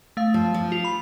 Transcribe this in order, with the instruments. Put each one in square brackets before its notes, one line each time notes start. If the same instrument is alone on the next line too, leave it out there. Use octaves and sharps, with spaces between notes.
[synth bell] A3 F5
[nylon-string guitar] F3
F3
[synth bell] F4
B5